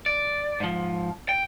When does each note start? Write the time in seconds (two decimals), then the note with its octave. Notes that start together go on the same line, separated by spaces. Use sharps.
0.06 D5
0.60 G#2 F3
1.29 G5